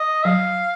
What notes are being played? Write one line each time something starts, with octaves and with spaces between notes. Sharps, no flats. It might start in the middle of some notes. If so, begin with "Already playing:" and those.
Already playing: D#5
F#3 F5